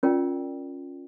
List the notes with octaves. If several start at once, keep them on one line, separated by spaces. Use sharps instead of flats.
C#4 F4 A#4 D5 G5